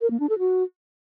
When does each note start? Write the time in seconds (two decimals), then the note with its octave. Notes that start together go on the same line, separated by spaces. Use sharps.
0.01 A#4
0.10 A#3
0.20 D4
0.29 A4
0.39 F#4